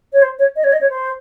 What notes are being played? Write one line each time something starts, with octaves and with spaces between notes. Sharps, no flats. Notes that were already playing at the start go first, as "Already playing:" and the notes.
C#5
C5
C#5
D#5
C#5
D#5
C#5
C5